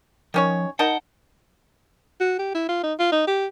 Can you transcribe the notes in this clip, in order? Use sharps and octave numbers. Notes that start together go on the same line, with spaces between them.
D#3 F3 C#4 C#5
D#4 A#4 F#5 G5 A5
F#4
G4
E4
F4
D#4
F4
D#4
G4